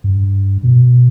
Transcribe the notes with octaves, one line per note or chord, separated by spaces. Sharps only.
G2
B2